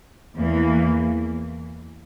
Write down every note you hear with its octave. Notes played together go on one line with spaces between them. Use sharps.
E2 E3 A#3